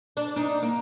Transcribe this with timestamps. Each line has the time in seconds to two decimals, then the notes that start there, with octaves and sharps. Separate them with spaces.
0.17 D4
0.36 D4 D#4
0.62 A#3